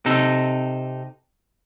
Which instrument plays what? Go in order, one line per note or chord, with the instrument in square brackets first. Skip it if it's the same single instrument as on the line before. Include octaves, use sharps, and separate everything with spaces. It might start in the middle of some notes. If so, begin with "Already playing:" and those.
[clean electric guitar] C3 D#4 A4